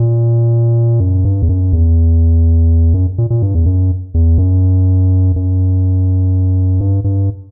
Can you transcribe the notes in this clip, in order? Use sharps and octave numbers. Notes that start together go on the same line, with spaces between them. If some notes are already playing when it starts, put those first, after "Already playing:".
Already playing: A#2
F#2
G2
E2
F#2
E2
F#2
A#2
A#2
G2
E2
F#2
E2
F#2
F#2
G2
G2